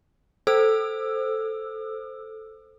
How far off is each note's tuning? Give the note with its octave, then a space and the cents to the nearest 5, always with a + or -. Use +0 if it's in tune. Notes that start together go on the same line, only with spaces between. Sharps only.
A4 +0 C5 +0 E6 +5